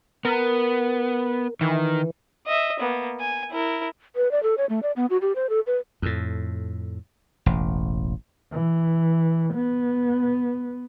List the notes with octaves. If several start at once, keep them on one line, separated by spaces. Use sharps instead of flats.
B3 A#4
D#3 E3
D#5 E5
A#3 B3
G#5
E4 A#4
B4
D5
A4
C#5
A3
D5
B3
F#4
G4
C5
A4
B4
F2 A2
E1 A1
E3
B3